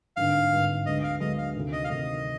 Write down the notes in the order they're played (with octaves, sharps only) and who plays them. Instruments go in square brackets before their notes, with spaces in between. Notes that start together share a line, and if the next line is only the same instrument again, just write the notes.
[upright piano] G#1 G2 D3 [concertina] F5
[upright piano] G#1 G2 D3
[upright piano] D2 D3 G#3 B3 [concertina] D#5
[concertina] F5
[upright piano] D2 D3 G#3 B3 [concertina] D#5
[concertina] F5
[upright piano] D2 C3 D#3
[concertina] D#5
F5
[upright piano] D2 C3 D#3 [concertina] D#5